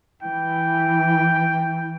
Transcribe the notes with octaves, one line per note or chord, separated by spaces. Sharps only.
E3 G5